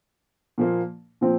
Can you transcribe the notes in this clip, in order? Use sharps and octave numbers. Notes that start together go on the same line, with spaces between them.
A#2 F3 A#3
A#2 F3 C4 F4